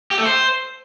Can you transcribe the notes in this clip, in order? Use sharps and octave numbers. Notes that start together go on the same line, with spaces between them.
G4
A3
C5